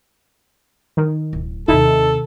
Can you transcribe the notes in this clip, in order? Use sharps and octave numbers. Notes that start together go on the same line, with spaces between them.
D#3
D1
D#2 C3 D#4 E4 A4